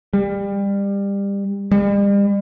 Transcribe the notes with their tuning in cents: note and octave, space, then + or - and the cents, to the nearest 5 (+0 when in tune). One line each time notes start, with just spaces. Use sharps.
G3 +25
G3 +40